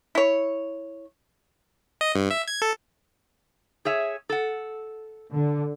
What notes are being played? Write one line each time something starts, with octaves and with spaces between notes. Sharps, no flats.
E4 C#5
D#5
G2
E5
G#6
A4
G#4 C#5 E5
A4 F#5
D3